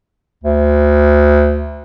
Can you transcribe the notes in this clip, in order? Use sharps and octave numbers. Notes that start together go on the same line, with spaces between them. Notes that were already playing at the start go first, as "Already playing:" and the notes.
D2